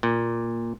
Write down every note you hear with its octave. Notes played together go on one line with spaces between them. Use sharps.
A#2